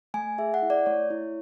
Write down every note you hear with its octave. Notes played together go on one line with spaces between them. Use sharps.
A3 G#5
G#4 E5
F#5
E4
D5
A3 C#5
E4